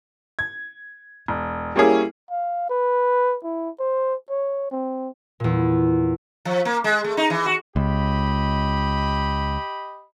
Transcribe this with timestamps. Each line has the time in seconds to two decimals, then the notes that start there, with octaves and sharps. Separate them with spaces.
0.39 G#6
1.28 E1
1.76 G3 A#3 C#4 E4 G#4
2.31 F5
2.70 B4
3.44 E4
3.79 C5
4.30 C#5
4.71 C4
5.40 E2 A#2
6.45 F3
6.65 A#3
6.84 G#3
7.04 A3
7.17 D#4
7.30 E3
7.46 F#4
7.76 C#2 G4 D#5 B5